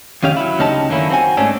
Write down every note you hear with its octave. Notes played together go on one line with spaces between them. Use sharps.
F2 D#3 C#4 G4 F5
F#3 E4
D2 C#3 C#4 D#4 G4 A5
F#2 D3 D#3 A#3 C#4 E4
C4 F#4 G#5
G#2 A3 C#4 D4 A4